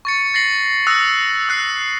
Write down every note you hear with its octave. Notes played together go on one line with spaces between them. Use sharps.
C#6 A6 C#7
A6 A#6 C7 F#7
D#6 E6 F#6 A#6
E6 F#6 C7